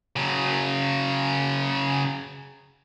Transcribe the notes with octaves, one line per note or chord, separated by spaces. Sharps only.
C#3 F#3